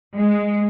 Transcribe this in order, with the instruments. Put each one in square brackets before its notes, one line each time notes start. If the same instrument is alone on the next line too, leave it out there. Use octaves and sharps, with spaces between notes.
[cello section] G#3